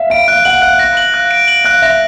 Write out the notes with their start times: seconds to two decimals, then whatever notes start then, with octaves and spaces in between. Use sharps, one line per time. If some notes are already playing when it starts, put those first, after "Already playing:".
Already playing: E5 F5
0.10 F5 D7
0.28 F5 F#6
0.45 F#5 F#7
0.62 F5 F#6
0.79 A#6
0.97 F#7
1.14 F#6
1.31 D7
1.48 F#7
1.65 F5 F#6
1.82 E5 A#6